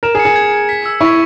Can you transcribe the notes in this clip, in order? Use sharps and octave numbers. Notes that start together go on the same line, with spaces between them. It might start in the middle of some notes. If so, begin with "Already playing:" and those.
A#4 E7
G#4
C#7
G#4
G#6
G#6
B6
E6
E4 C#6